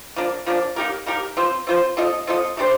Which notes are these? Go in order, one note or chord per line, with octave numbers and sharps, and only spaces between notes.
F3 A#3 D4
F3 A#3 D4
A#3 D#4 G4 A#4
A#3 D#4 G4 A#4
C4 F4 C5
C4 F4 C5
C4 F4 A4 D#5
C4 F4 A4 D#5
A3 D4 G4 C5